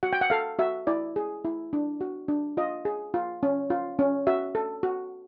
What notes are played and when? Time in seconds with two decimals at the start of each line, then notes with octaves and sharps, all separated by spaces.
0.03 F#4 F#5
0.13 G5
0.21 F#5
0.30 A4 F5
0.59 F#4 E5
0.87 E4 D5
1.16 G#4
1.45 E4
1.73 D4
2.01 F#4
2.28 D4
2.57 F4 D#5
2.85 G#4
3.14 F4
3.43 C#4
3.70 F4
3.99 C#4
4.27 F#4 E5
4.55 A4
4.83 F#4